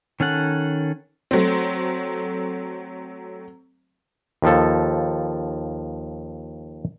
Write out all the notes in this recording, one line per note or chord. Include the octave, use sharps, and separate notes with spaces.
D#3 C#4 A4 F#5
F#3 A3 C4
D#2 F3 A4